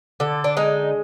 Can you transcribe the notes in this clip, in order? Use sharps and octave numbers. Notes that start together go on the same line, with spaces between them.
D3 A4
D4
G#3 D#4